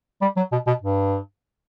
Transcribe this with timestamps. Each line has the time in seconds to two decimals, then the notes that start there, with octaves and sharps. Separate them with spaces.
0.22 G3
0.37 F#3
0.52 B2
0.67 B2
0.82 G2